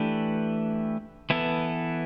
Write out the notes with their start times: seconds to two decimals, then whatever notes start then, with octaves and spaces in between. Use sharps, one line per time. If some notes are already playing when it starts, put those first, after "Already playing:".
Already playing: E3 A3 D4 G4 B4
1.30 E3 B3 E4 A4